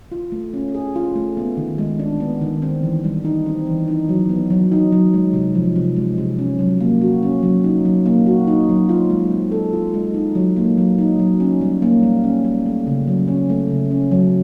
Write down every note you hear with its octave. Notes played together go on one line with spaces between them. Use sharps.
F4
A3
C#4
G#4
F4
A3
B3
D#3
G#3
D4
B3
D#3
C4
E3
G3
D#4
C4
E3
D#4
F#3
B3
F#3
D#4
F#3
G#3
C3
F3
C3
G#3
C3
C#4
F#3
A#3
F#4
C#4
F#3
D#4
F#3
A#3
F#4
D#4
F#3
F4
G#3
C4
A4
F4
G#3
D#4
F#3
A#3
F#3
D#4
F#3
C#4
G3
A#3
G3
C#4
G3
A3
C#3
F#3
C#4
A3
C#3
C#4
F#3